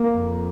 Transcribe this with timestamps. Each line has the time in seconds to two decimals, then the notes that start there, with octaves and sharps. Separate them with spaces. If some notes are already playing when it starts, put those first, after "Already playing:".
Already playing: A#3
0.11 F2